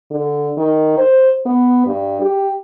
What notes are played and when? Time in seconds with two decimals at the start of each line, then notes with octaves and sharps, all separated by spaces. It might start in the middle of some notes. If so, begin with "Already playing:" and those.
0.10 D3
0.57 D#3
0.98 C5
1.45 B3
1.86 G2
2.21 G4